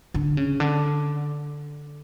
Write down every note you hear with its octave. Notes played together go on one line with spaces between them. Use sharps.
D3
C#3
D3